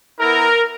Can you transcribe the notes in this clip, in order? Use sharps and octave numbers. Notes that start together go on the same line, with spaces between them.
B3 E4 A#4